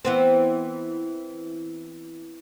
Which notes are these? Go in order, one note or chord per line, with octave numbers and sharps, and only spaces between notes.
E3 B3 C4